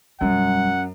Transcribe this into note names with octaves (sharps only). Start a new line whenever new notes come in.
E1 F#2 G3 F#5